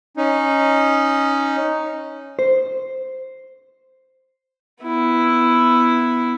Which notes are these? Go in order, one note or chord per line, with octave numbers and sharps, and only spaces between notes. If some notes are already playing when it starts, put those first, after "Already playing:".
C#4 D#4
C5
B3 E4